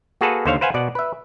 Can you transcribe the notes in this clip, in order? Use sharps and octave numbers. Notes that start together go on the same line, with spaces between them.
A#3 F#4 G#4 A4 B4 A5
D#2 D3 C5 C#5 F5
B4 C5 F5 F#5 G#5
B2 D5 F#5
B4 E5